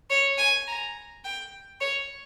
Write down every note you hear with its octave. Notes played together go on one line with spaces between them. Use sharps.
C#5
G#5
A#5
G5
C#5